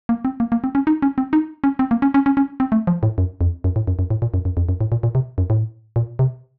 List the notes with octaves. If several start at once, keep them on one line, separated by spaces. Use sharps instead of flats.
A#3
C4
A#3
A#3
C4
C#4
D#4
C#4
C4
D#4
C#4
C4
A#3
C#4
C#4
C#4
C#4
C4
A3
F3
A2
F#2
F2
F#2
A2
F#2
F#2
A2
A#2
F#2
F#2
F2
F#2
A2
A#2
A#2
C3
F#2
A2
A#2
C3